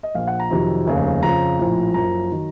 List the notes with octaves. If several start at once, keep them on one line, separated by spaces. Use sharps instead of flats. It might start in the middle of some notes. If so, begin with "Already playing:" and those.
D#5
A#1 A#2 F3 F5
F#5
A#5
F2 C3 D#3 F#3
F1 D#2 C#3
F2 C#3 F3 A#5
A#1 A2 F3
F#1 F#2 F3 A#5
D#3 F#3